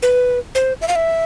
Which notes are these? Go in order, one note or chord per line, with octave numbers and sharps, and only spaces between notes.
B4
C5
E5
F5
E5